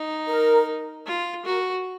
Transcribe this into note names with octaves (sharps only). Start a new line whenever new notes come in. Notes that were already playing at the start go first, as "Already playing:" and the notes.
Already playing: D#4
A#4
F4
F#4 A#4